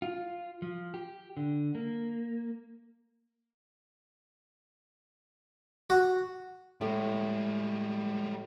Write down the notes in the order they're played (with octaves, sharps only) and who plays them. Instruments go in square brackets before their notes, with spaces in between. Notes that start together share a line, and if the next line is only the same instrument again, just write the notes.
[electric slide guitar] F4
F3
G4
D3
A#3
[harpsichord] F#4
[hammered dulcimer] A2 [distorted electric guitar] G3 G#3